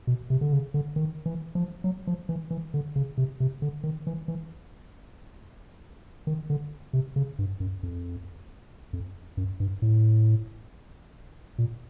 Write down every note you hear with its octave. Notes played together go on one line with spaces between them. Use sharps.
B2
C3
D3
C#3
D3
D#3
E3
F3
F#3
F3
E3
E3
D3
C#3
C3
C3
D3
D#3
E3
E3
D#3
D3
C3
C#3
G2
F#2
F2
F2
F#2
G2
A2
A#2